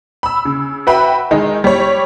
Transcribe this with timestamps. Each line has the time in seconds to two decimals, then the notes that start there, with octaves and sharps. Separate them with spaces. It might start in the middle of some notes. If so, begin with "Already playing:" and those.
0.23 B5 E6
0.45 C#3
0.87 F#4 B4 E5 G5 B5
1.31 D#3 G#3 D#4
1.64 G3 C#5